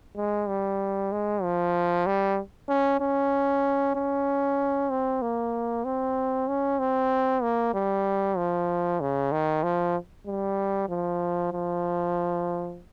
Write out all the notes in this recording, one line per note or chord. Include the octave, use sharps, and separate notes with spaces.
G#3
G3
G#3
F3
G3
C#4
C#4
C#4
C4
A#3
C4
C#4
C4
A#3
G3
F3
C#3
D#3
F3
G3
F3
F3